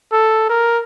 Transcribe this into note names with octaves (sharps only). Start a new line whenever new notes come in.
A4
A#4